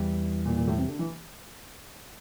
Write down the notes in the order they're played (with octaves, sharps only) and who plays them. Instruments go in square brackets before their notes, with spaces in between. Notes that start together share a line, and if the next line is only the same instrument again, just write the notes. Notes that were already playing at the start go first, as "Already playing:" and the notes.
Already playing: [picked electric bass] E2 E3 G3
[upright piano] A#2
A#2
A2
C3
D3
E3